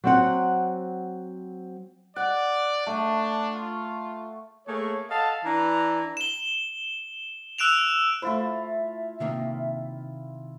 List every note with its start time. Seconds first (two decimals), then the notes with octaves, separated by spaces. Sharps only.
0.04 F#3 C4 F#5
2.16 D5 F#5
2.87 A3 D4
3.54 F4
4.67 A3 A#3 G#4 C#5
5.09 A4 D#5 F5 F#5 A5
5.45 E3 D4 B4 A#5
6.17 E7 G7
7.58 E6 F#6 D7 E7 F7
8.22 A3 E4 F4 C5 E5
9.20 C3 D#3 A#3